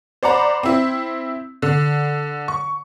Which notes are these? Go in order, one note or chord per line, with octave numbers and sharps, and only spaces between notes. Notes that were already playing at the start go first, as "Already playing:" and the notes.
C5 D5 F#5 A#5 B5
C4 E4
D3
C#6